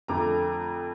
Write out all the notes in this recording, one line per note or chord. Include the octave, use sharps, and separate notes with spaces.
F2 D3 A3 A#5 D6